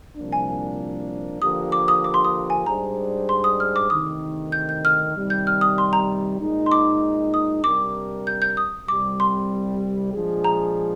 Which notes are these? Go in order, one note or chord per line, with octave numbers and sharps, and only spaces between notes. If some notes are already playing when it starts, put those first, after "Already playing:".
C2 A#2 F3 A#3 D4
G#5
D3 F3 A#3 D4 G4 D#6
D6
D#6
D6
C6
D#6
G#5
G#2 G3 D4 G#4 C5 A#5
C6
D#6
F6
D6
D2 C3 D#3 D#6
G6
G6
F6
C3 D#3 G3
G6
F6
D#6
C6
A#5
A#2 G#3 D#4
C6
D6
D#6
C3 G3 D4 G4 A#4 D6
G6
G6
D#6
C2 C3 G3 D6
C6
A#2 F3 G#3 D4 G#4
A#5